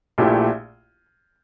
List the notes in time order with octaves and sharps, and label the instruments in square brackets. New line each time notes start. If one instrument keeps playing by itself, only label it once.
[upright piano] A#1 A#2 A3 E4 G4